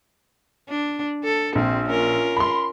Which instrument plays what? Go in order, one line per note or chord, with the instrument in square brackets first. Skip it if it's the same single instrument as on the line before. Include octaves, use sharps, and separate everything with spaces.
[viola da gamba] D4
A4
[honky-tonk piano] A#1 [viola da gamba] C4
[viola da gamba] C#4 F4 A#4
[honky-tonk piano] B5 C6